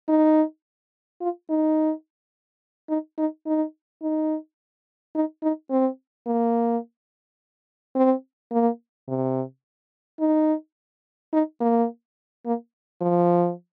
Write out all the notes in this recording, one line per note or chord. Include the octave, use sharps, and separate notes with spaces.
D#4
F4
D#4
D#4
D#4
D#4
D#4
D#4
D#4
C4
A#3
C4
A#3
C3
D#4
D#4
A#3
A#3
F3